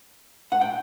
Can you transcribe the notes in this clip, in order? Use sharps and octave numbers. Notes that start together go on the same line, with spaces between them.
F#5
G5